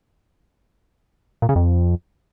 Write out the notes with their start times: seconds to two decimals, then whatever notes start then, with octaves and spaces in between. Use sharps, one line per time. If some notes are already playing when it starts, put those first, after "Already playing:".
1.42 A#2
1.49 C#3
1.56 F2